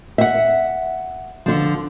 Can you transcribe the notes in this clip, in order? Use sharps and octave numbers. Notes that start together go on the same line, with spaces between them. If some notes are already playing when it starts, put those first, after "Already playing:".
E5 F#5
D3 F3